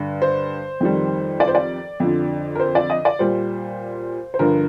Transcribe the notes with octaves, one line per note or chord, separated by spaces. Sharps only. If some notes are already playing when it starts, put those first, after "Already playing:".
Already playing: G2 D3
C5
F2 D#3 G3
D5
C5
D5
F2 D3 F3
A#4
C5
D5
D#5
D5
A#2 G3 C5
C5
G2 D3 F3 A#4